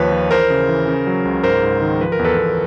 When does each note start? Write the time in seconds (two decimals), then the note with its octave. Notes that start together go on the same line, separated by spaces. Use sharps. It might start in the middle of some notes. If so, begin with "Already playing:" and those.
Already playing: D#2 F3 B4 C#5
0.12 F3
0.31 E3 A#4 C5
0.50 C#3
0.69 E3
0.88 C#3
1.07 F#3
1.25 C#2
1.44 G#2 A#4 C5
1.63 G#2
1.82 D#3
2.00 F3 B4
2.12 A#4
2.19 E2
2.25 A4 B4
2.38 E2